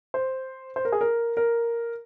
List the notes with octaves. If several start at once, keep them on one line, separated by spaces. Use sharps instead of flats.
C5
C5
A#4
G#4
A#4
A#4